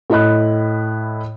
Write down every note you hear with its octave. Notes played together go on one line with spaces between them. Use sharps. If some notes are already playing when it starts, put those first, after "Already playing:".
A2 E4 D#5 B5 F#6